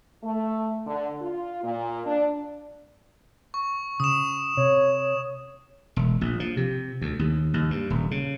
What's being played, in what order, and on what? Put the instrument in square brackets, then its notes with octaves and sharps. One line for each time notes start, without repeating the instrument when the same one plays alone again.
[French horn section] A3
D3
F4
A#2
D4
[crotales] C#6
[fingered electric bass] C#3 [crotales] D#6 E7
[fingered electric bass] C3 [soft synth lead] C#5
[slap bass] E1
A#1
F3
C3
D2
D#2
D#2
G2
D#1
C#3